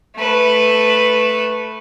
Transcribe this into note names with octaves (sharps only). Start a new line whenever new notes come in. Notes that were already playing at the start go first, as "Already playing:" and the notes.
A3 B4